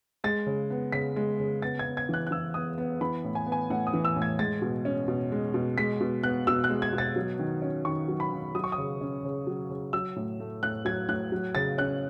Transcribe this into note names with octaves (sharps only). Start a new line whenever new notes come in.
G#3 A6
C#3
B3
C#3 B6
G#3
C#3
B3 A6
G#6
B3
G#6
E3 F#6
F#6
E3 E6
B3 D#6
B3
E3 B5
A2
G#5
B3
G#5
A2 F#5
D#6
E3
E6
A2
G#6
G#3 A6
B2
C#4
B2
G#3
B2
G#3 B6
B2
B3 F#6
B2 E6
F#6
G#3
G#6
B2
A6
F#3
D#3
C#4
D#3 C#6
F#3
B5
D#3
F#3 D#6
C#6
D#6
C#3
C#4
C#3
F#3
C#3
F#3 E6
A2
A3
A2 F#6
F#3 G#6
A2 F#6
F#3
C#3 A6
C#4 F#6